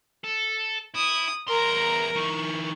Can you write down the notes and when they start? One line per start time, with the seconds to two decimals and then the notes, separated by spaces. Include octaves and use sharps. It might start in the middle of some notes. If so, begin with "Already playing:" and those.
0.24 A4
0.95 E4 D#6
1.48 E2 A#4 A#5 C6
2.16 E3 D#4 C#6